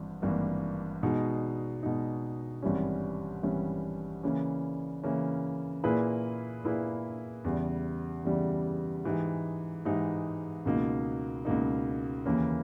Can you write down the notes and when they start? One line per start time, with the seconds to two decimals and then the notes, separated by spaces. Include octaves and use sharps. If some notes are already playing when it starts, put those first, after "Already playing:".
Already playing: G#1 G2 E3
0.22 G#1 G2 E3 A#3
1.03 B2 G#3 D#4
1.83 B2 G#3 D#4
2.62 G#1 G2 E3 G3 C#4
3.43 G#1 G2 E3 G3 C#4
4.23 C#3 E3 A#3 C#4
5.03 C#3 E3 A#3 C#4
5.84 A#2 A#3 E4 G#4 B4
6.64 A#2 A#3 E4 G#4 B4
7.45 E2 C#3 E3 G3
8.24 E2 C#3 E3 G3
9.04 G#2 E3 G#3 D#4 G4
9.85 G#2 E3 G#3 D#4 G4
10.65 C#2 B2 A#3 D#4
11.45 C#2 B2 A#3 D#4
12.26 D#2 C#3 E3 A#3 C#4